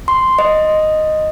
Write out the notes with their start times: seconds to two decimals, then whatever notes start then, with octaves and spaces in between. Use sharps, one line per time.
0.08 C6
0.39 D#5